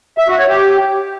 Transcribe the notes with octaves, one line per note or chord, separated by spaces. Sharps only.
E5
F#4
C#5
G4